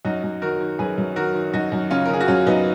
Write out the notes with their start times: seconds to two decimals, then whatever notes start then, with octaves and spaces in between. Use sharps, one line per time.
0.05 F#2 D#4 F#4
0.23 F#2
0.42 D#3 F#4 A#4
0.61 D#3
0.79 F#2 G#4 B4
0.98 F#2
1.16 D#3 F#4 A#4
1.35 D#3
1.53 F#2 D#4 F#4
1.72 F#2
1.91 C#3 C#4 F4
2.05 A#4
2.09 C#3 G#4
2.20 F#4
2.28 F#2 C#4 F4
2.47 F#2 B3 D#4